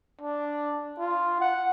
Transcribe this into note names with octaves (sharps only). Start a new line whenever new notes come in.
D4
F4
F#5